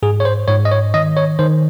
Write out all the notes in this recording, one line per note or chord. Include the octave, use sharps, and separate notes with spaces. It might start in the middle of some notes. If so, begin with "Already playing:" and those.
G#2 G#4
C#5
C5
G#2 C#5
D#5
C#5
D#3 D#5
C#5
D#3 C5